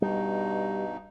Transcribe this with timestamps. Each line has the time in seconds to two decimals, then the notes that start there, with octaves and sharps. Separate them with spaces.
0.02 G2 B2 G3 D#4